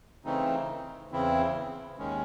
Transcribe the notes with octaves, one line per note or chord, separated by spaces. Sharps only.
C#3 E3 A3 C4 D#4
E2 C#3 E3 C4 E4
D#2 D#3 G#3 C#4